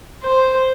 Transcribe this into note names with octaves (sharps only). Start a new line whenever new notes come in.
C5